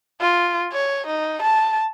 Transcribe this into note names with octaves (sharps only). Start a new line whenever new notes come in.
F4
C#5
D#4
A5